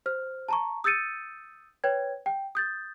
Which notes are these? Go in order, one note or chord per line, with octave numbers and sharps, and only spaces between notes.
C5 F6
A5 A#5 C#6
D#6 E6 G6 A6 C#7 D#7
B4 C#5 G5 G#6
G5
D#6 G6 A6